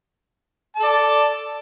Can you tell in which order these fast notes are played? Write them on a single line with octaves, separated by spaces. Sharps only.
A5 A4 D5